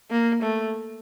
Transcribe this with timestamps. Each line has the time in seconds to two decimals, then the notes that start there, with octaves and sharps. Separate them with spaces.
0.11 A#3
0.42 A3